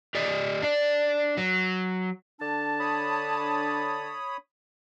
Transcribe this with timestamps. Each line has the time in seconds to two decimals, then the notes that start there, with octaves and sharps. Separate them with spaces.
0.15 G4 D5 D#5
0.62 D4 D5
1.37 F#3
2.40 D3 D4 A5
2.80 C#5 B5 D#6